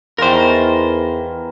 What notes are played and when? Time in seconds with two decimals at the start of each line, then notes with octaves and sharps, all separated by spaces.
0.18 E2 D#3 E3 F4 A#4 C5